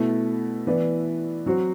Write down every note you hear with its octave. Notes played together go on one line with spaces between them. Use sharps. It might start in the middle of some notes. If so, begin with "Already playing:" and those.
Already playing: B2 A3 E4
E3 B3 E4 B4 D5
F#3 C4 F#4 C5